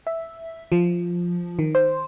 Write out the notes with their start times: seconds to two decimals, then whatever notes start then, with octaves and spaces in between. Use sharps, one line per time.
0.07 E5
0.72 F3
1.59 D#3
1.75 C5